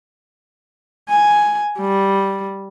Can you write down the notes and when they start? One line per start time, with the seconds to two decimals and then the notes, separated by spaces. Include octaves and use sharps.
1.10 G#5
1.79 G3